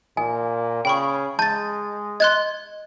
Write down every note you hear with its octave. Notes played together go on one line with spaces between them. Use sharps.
A#2 G#5
C#3 G5 B5 C#6
G#3 A5 G6 A6
D#5 C6 F#6 G#6